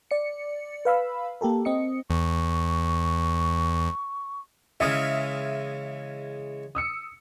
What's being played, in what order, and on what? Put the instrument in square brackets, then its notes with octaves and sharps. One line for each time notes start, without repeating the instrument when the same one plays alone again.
[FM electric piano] D5 C#7
B4 F5 B5 E6
A#3 G4 A4 A#4
C4 D#5 C#7
[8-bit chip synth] E2 [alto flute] C#6
[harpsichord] C#3 E3 G#3 [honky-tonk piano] E5 D#6 F6
[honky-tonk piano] D#6 E6 C#7